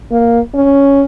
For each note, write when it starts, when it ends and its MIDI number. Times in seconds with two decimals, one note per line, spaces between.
0.12 0.40 58
0.55 1.04 61